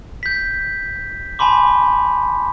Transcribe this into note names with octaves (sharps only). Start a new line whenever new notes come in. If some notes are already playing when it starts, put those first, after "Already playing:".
G6 B6
G#5 A5 B5 C6 D6